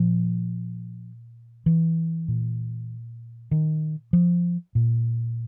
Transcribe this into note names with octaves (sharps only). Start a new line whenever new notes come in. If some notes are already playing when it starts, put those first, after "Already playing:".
Already playing: A#2 F3
E3
A#2
D#3
F3
A#2